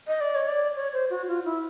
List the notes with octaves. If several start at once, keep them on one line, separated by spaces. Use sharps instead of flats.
D#5
D5
C#5
D5
C#5
C5
F#4
F4
E4